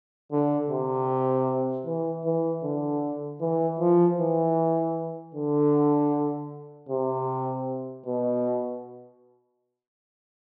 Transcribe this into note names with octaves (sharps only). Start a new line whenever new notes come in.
D3
C3
E3
E3
D3
E3
F3
E3
D3
C3
B2